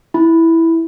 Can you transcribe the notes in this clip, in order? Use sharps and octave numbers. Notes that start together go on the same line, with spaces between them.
E4